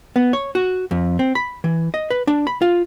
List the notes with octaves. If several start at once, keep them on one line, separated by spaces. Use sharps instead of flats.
B3
C#5
F#4
F2
C4
B5
E3
D#5
B4
D4
B5
F4